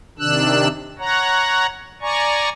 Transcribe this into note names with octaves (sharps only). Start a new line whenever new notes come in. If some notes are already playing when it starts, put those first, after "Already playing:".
C3 D#3 D4 E6 F#6
C#5 F#5 A#5
D5 G#5 A#5 C#6